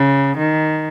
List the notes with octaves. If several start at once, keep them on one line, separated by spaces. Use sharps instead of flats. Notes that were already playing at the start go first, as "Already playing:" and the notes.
Already playing: C#3
D#3